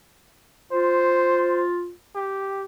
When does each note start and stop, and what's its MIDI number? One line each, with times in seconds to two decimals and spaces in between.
0.72 1.91 65
0.72 1.61 72
2.15 2.64 67